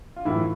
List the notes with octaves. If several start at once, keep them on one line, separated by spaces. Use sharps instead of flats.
F4
A2 E3 F#3 E4